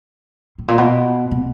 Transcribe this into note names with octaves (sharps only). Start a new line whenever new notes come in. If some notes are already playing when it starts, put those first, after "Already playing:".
A2
A#2
B2
C3